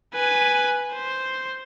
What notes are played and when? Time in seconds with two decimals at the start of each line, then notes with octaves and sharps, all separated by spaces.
0.14 B4 G#5
0.94 C5